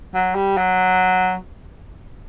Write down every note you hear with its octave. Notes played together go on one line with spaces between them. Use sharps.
F#3
G3
F#3